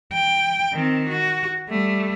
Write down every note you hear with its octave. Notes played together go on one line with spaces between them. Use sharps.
G5
D#3 C4
F#4
G3 A3